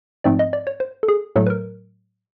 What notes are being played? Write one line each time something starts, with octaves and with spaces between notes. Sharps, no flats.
G#2 F3 A3 C4 D5
D#5
D5
C#5
C5
A4
G#4
A2 F#3 A3 A4
B4
A#4